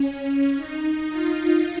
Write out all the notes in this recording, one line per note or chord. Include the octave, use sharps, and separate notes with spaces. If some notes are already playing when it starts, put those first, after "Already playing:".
Already playing: C#4
D#4
F4